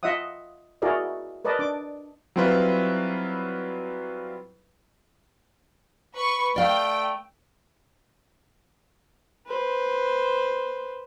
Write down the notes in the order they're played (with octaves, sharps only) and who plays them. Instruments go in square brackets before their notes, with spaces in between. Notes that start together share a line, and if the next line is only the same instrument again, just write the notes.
[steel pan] F4 D#5 E5 F#5 D#6
E4 F#4 G#4 A#4 D5 D#5
A#4 B4 D5 D#5 A5
D4 D6
[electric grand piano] F#3 G3 C4 E4 F4 B4
[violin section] B4 C#6
[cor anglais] A3 [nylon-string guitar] D5 F5 [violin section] G5
[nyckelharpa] B4 C5